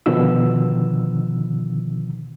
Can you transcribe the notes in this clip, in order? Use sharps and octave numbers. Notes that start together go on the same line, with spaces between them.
B2 D3 D#3 F3 E6